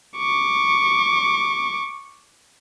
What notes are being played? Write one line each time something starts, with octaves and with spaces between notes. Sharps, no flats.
C#6 D6